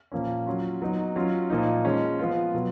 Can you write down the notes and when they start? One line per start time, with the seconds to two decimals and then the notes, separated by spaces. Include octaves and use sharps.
0.12 A#2 F3 A#3 C#4
0.46 F#3 C#4 F4
0.82 F#3 B3 D#4
1.16 F#3 C#4 F4
1.50 A#2 F3 A#3 D#4
1.85 F3 G#3 C#4
2.19 F3 B3 F4
2.54 B2 F#3 B3